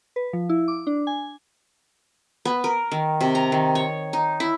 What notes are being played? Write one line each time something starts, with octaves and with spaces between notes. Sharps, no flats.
B4
F3
E4
D6
D4
G#5
B3
A#4
D#3
C3
A#5
D#3
C#5
D#4
E4